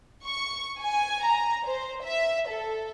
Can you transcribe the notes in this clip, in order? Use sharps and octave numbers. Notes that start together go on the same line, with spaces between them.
C#6
G#5
A#5
C5
E5
A4